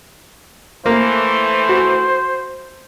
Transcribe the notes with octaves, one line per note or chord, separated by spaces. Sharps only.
E3 A3 A#3 C5
F#4